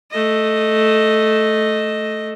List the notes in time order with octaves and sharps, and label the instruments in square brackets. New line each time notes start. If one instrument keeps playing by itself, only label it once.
[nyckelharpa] A3 D#5